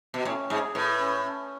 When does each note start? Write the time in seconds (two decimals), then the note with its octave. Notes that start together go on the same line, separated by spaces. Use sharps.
0.14 B2
0.25 A2 C#4
0.50 G#2 G#4
0.75 A2 B4
1.00 C#4
1.24 C#4